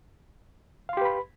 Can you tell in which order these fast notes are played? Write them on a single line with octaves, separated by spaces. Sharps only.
F5 C6 G4 B4 B5